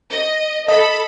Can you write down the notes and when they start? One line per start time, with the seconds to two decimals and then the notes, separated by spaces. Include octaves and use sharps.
0.11 D#5
0.68 A4 D#5 B5